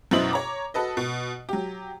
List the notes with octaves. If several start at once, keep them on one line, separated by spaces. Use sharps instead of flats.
F#2 B2 E4 C5 D#5 F#7
C#5 A#5 D6
F#4 A4 B4 D#5
B2
F#3 G4